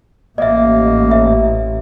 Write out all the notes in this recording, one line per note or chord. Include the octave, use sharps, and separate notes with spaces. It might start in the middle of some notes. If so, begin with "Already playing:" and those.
A1 A#3 D#5 E5
E5